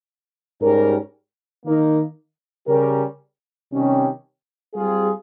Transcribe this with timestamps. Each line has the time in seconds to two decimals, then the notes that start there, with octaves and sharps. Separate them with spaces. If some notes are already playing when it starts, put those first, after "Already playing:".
0.60 G#2 G3 C#4 G4 A#4
1.64 D#3 A#3 D#4 A#4
2.67 C#3 G3 C#4 G4 A#4
3.71 C3 D#3 G3 C#4 G4
4.74 G3 C4 F4 G#4